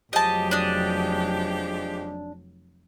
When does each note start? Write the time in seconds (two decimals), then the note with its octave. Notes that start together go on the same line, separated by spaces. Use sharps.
0.13 F1 F3 F#3 G#3 G4 D#5 A5
0.51 D4 D#5